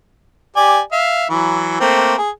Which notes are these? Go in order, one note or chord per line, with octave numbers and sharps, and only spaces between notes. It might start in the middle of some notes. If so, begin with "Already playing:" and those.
G4 D5 G#5
E5 F5
E3 F#3
A3 A#3 C4
G#4